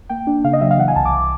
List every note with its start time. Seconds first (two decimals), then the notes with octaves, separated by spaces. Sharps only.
0.09 A#3 G5
0.27 D4
0.44 C#3 F5
0.53 D#5
0.61 F#3 E5
0.71 F5
0.78 E3 F#5
0.88 G#5
0.96 C2 A5
1.05 D6